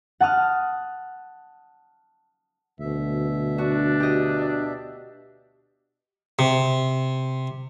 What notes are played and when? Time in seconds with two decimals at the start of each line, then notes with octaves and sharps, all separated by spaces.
0.20 F#5 A5 D#6 F6
2.80 D2 B2 E5
3.58 D4 F#4
4.00 G4 D#5
6.39 C3